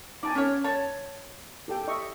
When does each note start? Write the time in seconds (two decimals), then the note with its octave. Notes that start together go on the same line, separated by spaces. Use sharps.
0.23 D#4 G#5 A5 D6
0.35 C#4 C#5
0.64 C#5 A5
1.68 G4 A4 G5
1.87 D#5 E5 C#6